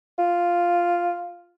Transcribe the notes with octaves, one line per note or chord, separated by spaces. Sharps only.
F4